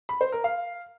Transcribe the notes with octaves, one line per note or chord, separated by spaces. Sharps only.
B5
C5
A#4
F5